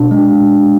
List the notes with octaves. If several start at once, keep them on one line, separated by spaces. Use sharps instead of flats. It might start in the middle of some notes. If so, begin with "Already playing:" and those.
Already playing: B2 D4
G#3